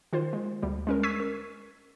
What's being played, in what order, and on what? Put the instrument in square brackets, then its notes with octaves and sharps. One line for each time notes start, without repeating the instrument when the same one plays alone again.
[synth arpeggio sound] D#3 F4 C5
G#3
D2 G3
G#3 C#4 A#4
C#6 E6 G#6 B6 D#7
A#4